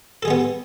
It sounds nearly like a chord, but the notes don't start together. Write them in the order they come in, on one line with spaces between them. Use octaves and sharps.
A4 G#4 G3 B3